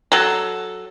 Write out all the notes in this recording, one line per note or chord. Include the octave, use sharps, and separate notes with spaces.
F#3 A4